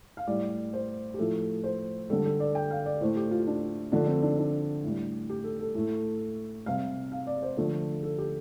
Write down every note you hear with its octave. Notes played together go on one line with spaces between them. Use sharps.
F5
A2 G3 D5
C5
G4
A2 F3 A3 A4
C5
D3 G3 A4
A4
D5
G5
F5
D5
A2 A3 C5
G4
F4
D4
D3 F3 A3 D4
C4
D4
D4
A2 G3
G4
A4
A4
A2 A3
C3 G3 F5
F5
D5
C5
D3 F3 A3 A4
A4
G4